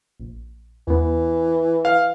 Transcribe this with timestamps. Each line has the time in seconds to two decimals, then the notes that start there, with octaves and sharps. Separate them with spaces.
0.20 A#1
0.88 E2 E3 B3
1.85 F5